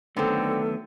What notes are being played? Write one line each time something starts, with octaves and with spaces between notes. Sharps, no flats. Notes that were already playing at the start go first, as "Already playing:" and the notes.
D3 D#3 F#3 A3 B3 C4 A4